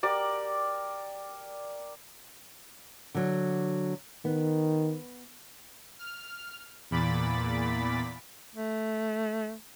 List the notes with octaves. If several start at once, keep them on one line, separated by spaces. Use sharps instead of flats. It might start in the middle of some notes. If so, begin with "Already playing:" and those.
G4 A#4 D5 D6
D3 F#3
D#3 B3
F6
E2 A#2 B5 D6 A6 B6
A3